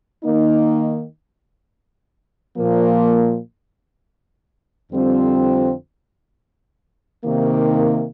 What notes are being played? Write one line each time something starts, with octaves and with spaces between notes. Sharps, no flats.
D#3 A#3 D#4
A#2 F3 A#3
F2 D3 G3 C4 F4
C3 D#3 A#3